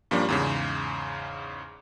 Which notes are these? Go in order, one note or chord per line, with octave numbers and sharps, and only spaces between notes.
G2 F3 G3 A#3 C#4 D4
E2 G#2 C#3